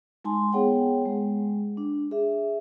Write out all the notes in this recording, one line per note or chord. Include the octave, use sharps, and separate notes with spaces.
G#3 D#4 G#5 A5 C6
B3 G#4 C#5 F#5 G5
G#3
D4
G#4 E5